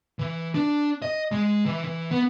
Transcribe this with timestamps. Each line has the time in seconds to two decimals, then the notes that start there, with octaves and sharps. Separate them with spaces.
0.19 E3
0.55 D4
1.02 D#5
1.32 G#3
1.66 E3
1.84 E3
2.11 B3